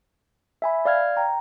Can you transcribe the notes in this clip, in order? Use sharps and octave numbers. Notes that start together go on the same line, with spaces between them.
E5 G#5 B5
D5 F5 F6 G#6
G5 A#5